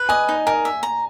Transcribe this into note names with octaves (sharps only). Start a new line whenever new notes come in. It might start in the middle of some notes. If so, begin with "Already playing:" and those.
Already playing: B4
D#5 G#5
D#4
A#4 G#5
E5
A#5